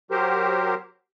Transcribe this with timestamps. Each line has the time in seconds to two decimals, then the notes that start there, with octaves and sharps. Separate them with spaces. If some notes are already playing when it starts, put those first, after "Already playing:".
0.11 F#3 G4 A#4 C5